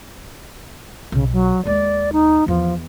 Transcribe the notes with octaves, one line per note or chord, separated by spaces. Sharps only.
B1 C#3
F#3
D#2 G#3 D5
D#4
E2 F3